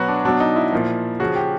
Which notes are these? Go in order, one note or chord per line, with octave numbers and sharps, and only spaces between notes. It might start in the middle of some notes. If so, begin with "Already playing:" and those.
Already playing: B2 F#3 F#4 B4
D4
B2 F#3 D4
D#4
E4
A#2 F3
C#3 F3 F#4
G4